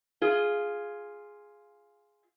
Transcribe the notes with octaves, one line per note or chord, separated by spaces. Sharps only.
F4 G#4